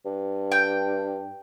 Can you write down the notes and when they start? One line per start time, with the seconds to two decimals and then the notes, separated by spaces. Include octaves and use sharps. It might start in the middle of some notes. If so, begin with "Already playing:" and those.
0.05 G2
0.52 G5